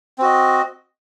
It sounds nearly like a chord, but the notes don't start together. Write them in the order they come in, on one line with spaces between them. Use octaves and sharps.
C4 F#4 D#5